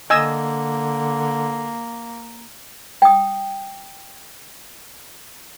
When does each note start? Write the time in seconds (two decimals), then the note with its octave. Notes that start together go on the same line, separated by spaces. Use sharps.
0.10 D3 A#3 D#5 G#5 E6
3.02 G5 D#6